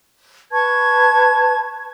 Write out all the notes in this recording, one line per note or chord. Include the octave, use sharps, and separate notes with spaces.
B4 A5 C#6 G#6